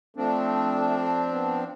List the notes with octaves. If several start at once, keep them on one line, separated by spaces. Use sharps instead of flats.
F3 A3 C4 D4
B3